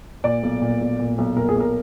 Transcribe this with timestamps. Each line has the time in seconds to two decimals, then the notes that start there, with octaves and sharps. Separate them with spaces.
0.24 A#2 D5
0.43 B1
0.62 A#2
0.81 B1
0.99 A#2
1.18 B1
1.36 A#2 A#4
1.49 G#4
1.56 B1 A#4